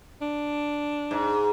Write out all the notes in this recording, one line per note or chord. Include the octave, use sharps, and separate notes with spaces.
D4
G#2